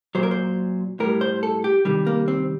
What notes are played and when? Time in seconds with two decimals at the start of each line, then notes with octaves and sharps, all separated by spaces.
0.15 A#2 F#3 C5
0.23 A#4
0.31 C5
1.00 A2 G3 A#4
1.21 C5
1.43 A4
1.64 G4
1.85 C3 D#3 G3
2.07 A#3
2.28 C4